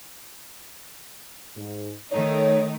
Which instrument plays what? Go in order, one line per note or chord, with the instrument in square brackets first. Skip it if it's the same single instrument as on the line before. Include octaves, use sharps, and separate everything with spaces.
[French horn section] G#2
[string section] D#3 A3 D#4 [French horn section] C#5